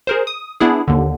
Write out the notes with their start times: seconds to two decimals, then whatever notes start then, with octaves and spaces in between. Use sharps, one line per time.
0.07 G#4 A#4 C5
0.27 D#6
0.60 B3 D4 E4 G#4
0.88 D#2 D3